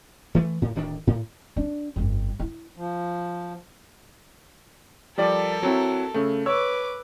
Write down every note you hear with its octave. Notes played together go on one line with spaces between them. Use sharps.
E3 A3
A2
D1 D2 D#3 D4
A2
D4
G1 F2
E4
F3
F3 G3 A4 A#4 D5
F#3 C4 E4
C#3 A3
B4 C#5 D6 E6